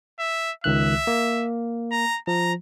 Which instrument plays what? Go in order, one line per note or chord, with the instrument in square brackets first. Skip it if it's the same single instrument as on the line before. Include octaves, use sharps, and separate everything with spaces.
[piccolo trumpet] E5
[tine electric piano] C#2 D#3 F#6 [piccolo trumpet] E5
[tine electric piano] A#3
[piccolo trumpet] A#5
[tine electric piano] F3 [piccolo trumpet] A#5